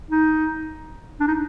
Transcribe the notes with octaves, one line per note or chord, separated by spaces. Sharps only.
D#4
D4
D#4